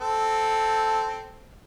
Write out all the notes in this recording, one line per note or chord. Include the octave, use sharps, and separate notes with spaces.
C4 A4